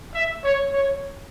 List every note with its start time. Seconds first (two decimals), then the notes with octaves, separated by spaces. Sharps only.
0.15 E5
0.45 C#5
0.74 C#5